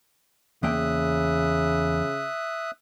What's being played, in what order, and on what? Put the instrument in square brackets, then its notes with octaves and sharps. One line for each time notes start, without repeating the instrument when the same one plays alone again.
[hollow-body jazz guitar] E2 A#3 G5 [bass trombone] C#3 [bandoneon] E5 D#6 F#6